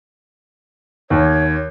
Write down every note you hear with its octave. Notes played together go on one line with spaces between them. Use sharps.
D#2 C#5